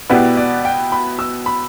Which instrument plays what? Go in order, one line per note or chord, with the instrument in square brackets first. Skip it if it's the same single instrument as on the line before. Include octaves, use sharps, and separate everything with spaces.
[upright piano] B2 B3 E4 G4 B4 [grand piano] D5
[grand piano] D5
G5
B5
E6
B5